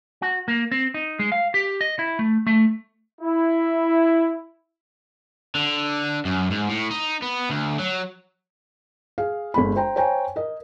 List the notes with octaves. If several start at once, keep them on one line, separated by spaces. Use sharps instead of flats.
F#4
A#3
C4
D#4
G#3
F5
G4
D#5
E4
A3
A3
E4
D3
F#2
G#2
A2
D#4
B3
D2
F#3
G#4 F5
G1 G#3 B5
C5 G5 A#5
C5 C#5 G5 G#5 A#5
A#4 D#5